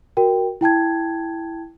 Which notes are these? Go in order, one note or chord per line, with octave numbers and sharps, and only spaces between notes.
F#4 A#4 G5
E4 G5 A5 G#6